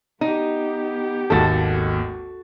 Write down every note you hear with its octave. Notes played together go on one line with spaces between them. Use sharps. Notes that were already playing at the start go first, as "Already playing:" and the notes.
B3 D#4 G4
G#1 D#2 F#4 A4 A6